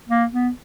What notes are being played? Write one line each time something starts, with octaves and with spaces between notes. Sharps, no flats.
A#3
B3